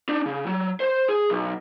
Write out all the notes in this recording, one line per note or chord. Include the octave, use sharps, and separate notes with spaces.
D4 D#4
C#3
F#3
C5 C6
G#4
B1